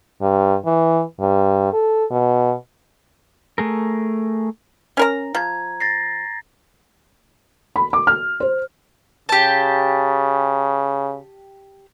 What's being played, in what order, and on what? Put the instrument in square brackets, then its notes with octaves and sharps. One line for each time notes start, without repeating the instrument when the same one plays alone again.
[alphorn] G2
E3
G2
A4
B2
[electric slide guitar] A3 G#4 A#4
[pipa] C#4 A#4 A#5
[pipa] F3 [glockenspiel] A#5 G#6
[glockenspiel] A6 A#6 C7
[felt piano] B5
D6
F6
C5
[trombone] C#3 [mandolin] G4 A5